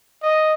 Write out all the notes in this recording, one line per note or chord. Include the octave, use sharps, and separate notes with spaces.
D#5